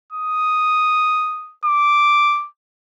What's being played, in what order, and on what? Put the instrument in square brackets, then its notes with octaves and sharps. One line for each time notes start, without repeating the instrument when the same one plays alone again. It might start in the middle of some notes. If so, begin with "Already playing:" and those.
[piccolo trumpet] D#6
D6